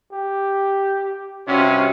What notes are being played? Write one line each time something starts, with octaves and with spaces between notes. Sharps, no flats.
G4
G2 C3 C#4 F#4